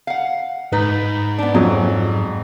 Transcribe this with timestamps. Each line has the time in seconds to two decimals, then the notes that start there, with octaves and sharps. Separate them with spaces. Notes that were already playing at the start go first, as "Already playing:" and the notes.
0.07 F5 F#5
0.72 G#2 D#4 B4
1.38 B3 D4
1.54 F2 F#3 G#4